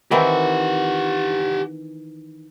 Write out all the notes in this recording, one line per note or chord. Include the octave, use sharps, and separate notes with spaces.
D#3 E3 C4 G4 F#5